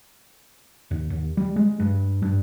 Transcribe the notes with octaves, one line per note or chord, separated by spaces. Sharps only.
D#2
D#2
G3
G#3
G2
G2